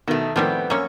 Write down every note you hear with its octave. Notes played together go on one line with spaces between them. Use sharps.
B2 D#3 A3
A2 D#3 F3 G3 A3 B3 C4
F#2 A#3 C#4 C#5 C#6